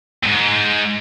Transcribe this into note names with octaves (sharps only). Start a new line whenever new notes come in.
D#2 G#2